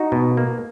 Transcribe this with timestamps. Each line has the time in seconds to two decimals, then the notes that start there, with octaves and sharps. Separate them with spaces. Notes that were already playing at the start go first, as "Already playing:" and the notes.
Already playing: D#4 F#4
0.12 B2
0.37 A#3